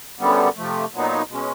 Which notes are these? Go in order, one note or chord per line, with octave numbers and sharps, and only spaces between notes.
F#2 D3 G3 B3
C3 F3 A3
A#2 F#3 B3 D#4
B2 G#3 C#4